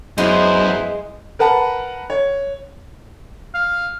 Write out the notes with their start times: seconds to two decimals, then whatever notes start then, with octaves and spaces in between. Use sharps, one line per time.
0.18 F#2 G#3 B3 E4 C5
1.39 A#4 B4 F#5 A5
2.10 C#5
3.54 F5